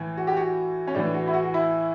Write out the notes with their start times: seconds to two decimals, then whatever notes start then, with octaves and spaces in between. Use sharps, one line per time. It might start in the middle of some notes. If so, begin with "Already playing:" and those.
Already playing: A2 E3
0.17 F#4
0.27 G4
0.37 F#4
0.87 C#4
0.94 A2 E3 D4
1.14 F#4
1.28 E4
1.33 F#4
1.44 F#4
1.54 E4